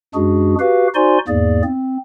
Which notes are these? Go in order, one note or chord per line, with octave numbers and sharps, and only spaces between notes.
F#2 G#3 D4 F#4 G#4
F#4 G4 B4 F5
D#4 F#4 C5 D5 G#5 C6
E2 G#2 A#3 G#4 D5
C4